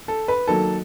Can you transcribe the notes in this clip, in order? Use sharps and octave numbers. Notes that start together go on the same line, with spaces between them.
A4
B4
D#3 F#3 A#3 A4